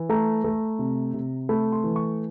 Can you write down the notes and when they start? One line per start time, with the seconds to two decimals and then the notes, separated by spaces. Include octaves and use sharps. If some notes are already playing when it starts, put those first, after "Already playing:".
Already playing: E3
0.09 A3 A#5
0.44 A3
0.79 C3
1.14 C3
1.49 A3 B5
1.72 C6
1.84 E3
1.96 C#6